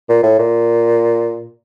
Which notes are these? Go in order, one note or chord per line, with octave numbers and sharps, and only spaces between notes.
A#2
A2
A#2